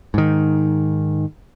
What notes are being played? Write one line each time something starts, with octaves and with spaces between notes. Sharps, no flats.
G#2 D#3